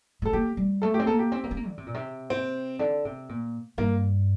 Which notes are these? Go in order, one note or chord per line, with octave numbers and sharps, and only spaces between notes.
A3 A4
A#3 G4
G3
A3 A4
G4
C4
A#3 A4
G4
C4
A#3
C4
A#3
D3
C3
A#2
C3
C4
D3
C3
A#2
G2 A#3